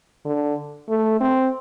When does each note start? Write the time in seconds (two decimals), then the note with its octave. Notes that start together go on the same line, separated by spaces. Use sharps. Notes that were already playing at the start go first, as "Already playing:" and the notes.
0.25 D3
0.89 A3
1.21 C4